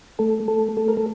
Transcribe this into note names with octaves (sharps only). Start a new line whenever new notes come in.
A3 A4
A3 A4
A3 A4
A#4
A4